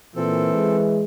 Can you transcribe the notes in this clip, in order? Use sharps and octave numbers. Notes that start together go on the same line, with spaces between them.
A#2 E3 C4 A4
G#3